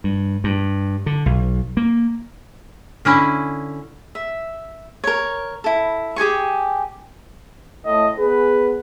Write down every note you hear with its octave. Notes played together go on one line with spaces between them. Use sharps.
G2
G2
D3
B1
A#3
D3 C#4 E4 G#5
E5
A#4 C#5
E4 A4
G4 G#4 G#5 C#6
A2 D#5
B3 G#4 B4